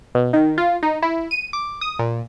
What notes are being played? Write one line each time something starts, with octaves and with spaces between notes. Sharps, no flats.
B2
D#3
F4
D#4
E4
D#7
D6
D#6
A#2